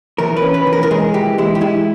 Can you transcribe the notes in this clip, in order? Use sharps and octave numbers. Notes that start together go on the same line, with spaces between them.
E3 A#4
B4
C#4
B4
E3
A#4
A#4
G#3 G#4
E3 G4
G#3 E4
G4
G#3 E4